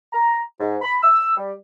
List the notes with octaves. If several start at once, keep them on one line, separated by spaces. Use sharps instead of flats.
A#5
G#2
B5
E6
G3